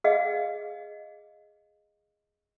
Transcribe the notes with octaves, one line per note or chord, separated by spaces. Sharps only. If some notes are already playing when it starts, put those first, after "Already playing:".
G#4 D#5 F5